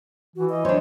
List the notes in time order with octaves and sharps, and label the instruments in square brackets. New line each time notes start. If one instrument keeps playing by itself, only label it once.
[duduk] E3 [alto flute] F#4
[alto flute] D#5
[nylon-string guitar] D4 C#5 [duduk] C5